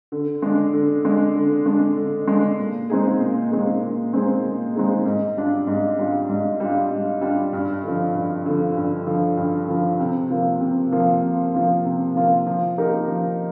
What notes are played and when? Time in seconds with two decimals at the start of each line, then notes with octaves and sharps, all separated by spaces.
0.12 D3
0.42 G#3 D4
0.73 D3
1.05 G#3 D4
1.35 D3
1.66 G#3 D4
1.97 D3
2.28 G#3 D4
2.59 A#2
2.90 G#3 C4 D#4 G#4
3.20 A#2
3.51 G#3 C4 D#4 G#4
3.82 A#2
4.13 G#3 C4 D#4 G#4
4.44 A#2
4.75 G#3 C4 D#4 G#4
5.05 G#2
5.37 G3 D4 F4
5.67 G#2
5.99 G3 D4 F4
6.29 G#2
6.60 G3 D4 F4
6.91 G#2
7.21 G3 D4 F4
7.53 G2
7.83 D3 F3
8.15 G2
8.46 D3 F3
8.77 G2
9.07 D3 F3
9.37 G2
9.68 D3 F3
10.00 C3
10.30 F3 A#3 F4
10.61 C3
10.92 F3 A#3 F4
11.23 C3
11.54 F3 A#3 F4
11.85 C3
12.15 F3 A#3 F4
12.46 F3
12.77 A#3 D#4 G4 A#4
13.08 F3